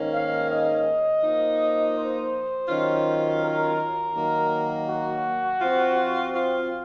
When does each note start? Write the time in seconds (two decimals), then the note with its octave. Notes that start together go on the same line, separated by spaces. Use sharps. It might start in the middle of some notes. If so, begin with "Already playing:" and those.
Already playing: G#2 D#3 A#3 C#4
0.13 F5
0.49 D#5
1.22 F3 A#3 D#4
1.95 C5
2.68 D#3 F#3 C#4 F4
3.42 A#4
4.14 D#3 F#3 A#3
4.88 F#4
5.61 F3 C4 F4
6.33 F4